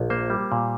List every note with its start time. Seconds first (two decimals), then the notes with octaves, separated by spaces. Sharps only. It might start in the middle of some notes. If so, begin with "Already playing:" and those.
Already playing: A#1
0.10 A#3 C5
0.30 G3
0.52 A#2